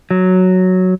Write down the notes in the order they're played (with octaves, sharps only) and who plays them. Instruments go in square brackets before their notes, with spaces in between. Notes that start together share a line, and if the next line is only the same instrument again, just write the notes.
[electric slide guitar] F#3